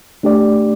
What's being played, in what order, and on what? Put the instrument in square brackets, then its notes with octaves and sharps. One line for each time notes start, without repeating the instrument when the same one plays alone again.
[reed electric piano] A3 D4 G4 D5